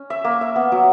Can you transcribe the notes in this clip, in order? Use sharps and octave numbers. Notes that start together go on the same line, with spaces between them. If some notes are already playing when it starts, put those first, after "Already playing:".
Already playing: C#4
E5
A#3
E5
B3
F#3